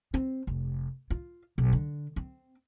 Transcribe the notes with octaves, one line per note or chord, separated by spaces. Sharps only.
C4
F1
F4
B1
D3
C4